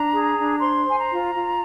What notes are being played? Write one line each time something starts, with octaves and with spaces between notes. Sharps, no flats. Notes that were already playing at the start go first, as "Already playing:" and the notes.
Already playing: D4 A#5
G#4
D4
C5 C6
C5 G#5
A#5
F4
F4